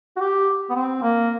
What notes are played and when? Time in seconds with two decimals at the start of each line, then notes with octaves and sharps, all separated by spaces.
0.16 F#4
0.20 G4
0.70 B3
0.75 C4
1.02 A#3